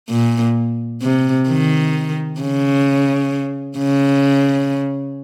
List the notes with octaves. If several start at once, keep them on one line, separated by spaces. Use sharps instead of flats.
A#2
C3
D#3
C#3
C#3